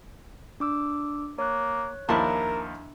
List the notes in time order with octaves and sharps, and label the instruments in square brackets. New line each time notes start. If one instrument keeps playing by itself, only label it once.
[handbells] D4 D6 E6
[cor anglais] A#3 [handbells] C#5 F#6
[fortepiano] D#2 F3 A5 [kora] D4 E4 [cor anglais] A#4